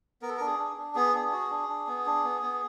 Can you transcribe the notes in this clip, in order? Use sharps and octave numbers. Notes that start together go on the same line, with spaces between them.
B3 A#4
A4
D4 A#4
G#4
D4
D4
B3 G#4
D4
F#4
D4
D4
B3
D4
B3
B3